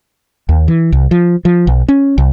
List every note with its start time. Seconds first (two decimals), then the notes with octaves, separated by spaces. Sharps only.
0.49 D#2
0.68 E3
0.92 C2
1.11 F3
1.45 F3
1.67 B1
1.88 C#4
2.18 C2